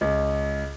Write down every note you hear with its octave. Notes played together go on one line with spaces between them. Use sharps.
C#2